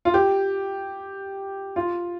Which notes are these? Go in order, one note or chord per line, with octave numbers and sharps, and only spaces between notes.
F4
G4
F4